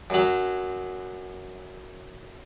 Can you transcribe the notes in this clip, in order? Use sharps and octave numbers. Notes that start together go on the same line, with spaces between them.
F#2 F#3